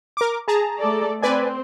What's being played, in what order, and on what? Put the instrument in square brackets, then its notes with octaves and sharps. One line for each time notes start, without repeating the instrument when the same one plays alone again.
[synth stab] A#4 D6
G#4 A5 A#5
[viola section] A3 A4 D5
[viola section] C4 [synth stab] B4 D5 G#5